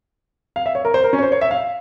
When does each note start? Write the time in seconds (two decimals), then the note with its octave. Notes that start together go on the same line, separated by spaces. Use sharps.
0.56 F5
0.66 E5
0.75 C#5
0.85 A#4
0.94 C5
1.04 A#4
1.13 C#4
1.19 C#5
1.23 C5
1.32 C#5
1.41 E5
1.51 F5